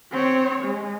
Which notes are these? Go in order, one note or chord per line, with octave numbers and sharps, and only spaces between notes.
C4 C#5
G#3